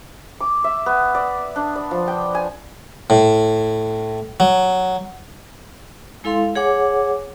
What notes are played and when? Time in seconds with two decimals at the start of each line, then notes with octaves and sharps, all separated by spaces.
0.40 D6
0.64 E5
0.86 B3
1.15 D5
1.56 D4
1.76 D5
1.91 F3
2.08 G5
2.35 G#5
3.10 A2
4.40 F#3
6.24 G#3 E4 A4 F5 C6
6.55 G#4 C#5 F#5 G#5 D6